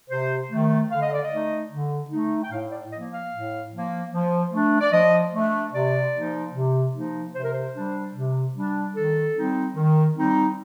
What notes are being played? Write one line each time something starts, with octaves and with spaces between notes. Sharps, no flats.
C3 C5
D#3 A3
D3 F5
D#5
D5
D#5
A3 D#4
D3
A3 D#4
G5
A2 F5
D5
F3 A#3 D#5
F5
A2
F3 A#3
F3
A3 D4
D5
F3 D#5
A3 D4
C3 D5
F3 A#3 D#4
C3
F3 A#3 D#4
C3 C5
A#4
C5
G3 D4
C3
G3 D4
D#3 A4
G3 C4 D#4
D#3
G3 C4 D#4